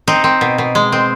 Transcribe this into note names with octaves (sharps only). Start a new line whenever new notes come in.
C4 D#4
C4
B2
B2
G#3
C4